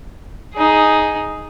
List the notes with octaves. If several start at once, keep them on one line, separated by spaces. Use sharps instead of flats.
D#4 G#4